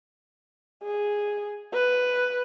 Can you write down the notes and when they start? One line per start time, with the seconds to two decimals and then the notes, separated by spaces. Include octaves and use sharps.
0.83 G#4
1.73 B4